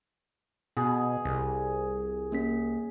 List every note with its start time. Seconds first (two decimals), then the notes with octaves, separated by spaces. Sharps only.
0.77 B2 G#4
1.25 C2
2.32 A#3 C#4 B6